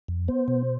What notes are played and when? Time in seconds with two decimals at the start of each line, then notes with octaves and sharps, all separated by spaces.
0.08 F2
0.28 B3 C5
0.48 B2